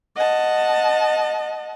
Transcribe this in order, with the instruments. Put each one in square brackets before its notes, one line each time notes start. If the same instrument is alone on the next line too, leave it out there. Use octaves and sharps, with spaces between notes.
[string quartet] D#5 F#5 A5